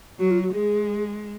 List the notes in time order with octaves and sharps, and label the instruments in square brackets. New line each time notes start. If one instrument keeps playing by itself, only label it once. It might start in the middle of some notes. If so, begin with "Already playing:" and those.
[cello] F#3 [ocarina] F#4
[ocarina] F4
F#4
[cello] G#3 [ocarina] G#4